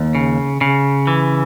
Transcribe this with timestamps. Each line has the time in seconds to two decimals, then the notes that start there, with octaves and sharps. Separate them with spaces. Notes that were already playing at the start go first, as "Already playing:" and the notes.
Already playing: D#2
0.15 C#3
0.61 C#3
1.07 E3